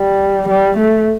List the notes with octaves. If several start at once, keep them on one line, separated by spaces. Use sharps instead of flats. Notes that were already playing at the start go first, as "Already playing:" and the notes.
Already playing: G3
G3
A3